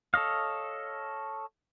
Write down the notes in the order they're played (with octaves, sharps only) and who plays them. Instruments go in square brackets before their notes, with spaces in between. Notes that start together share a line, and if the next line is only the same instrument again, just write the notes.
[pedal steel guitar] A4 C#5 D#5 F5